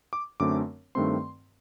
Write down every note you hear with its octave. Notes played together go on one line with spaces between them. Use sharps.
D6
F#2 D3 A3 C4 D6
G2 D#3 A3 C4 C6